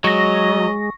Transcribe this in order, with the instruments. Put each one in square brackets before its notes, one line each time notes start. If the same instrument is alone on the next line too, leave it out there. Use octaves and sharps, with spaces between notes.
[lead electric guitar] F#3 [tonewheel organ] G#3 [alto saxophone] D#5 [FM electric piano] C#6 A#6